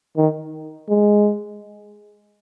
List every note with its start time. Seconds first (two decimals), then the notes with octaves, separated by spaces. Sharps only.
0.17 D#3
0.89 G#3